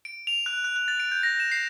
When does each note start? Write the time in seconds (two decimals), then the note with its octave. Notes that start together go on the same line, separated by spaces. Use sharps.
0.05 D7
0.27 F7
0.46 F#6
0.64 F#6
0.76 F#6
0.88 A6
1.00 D7
1.11 G6
1.23 A#6
1.40 E7
1.52 C7